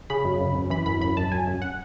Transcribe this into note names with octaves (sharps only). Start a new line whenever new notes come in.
C#3 B5
F#2
F#2
F#2
E3 B5
F#2 B5
F#2 B5
F#2 A5
F#2 G#5
F#2
F#5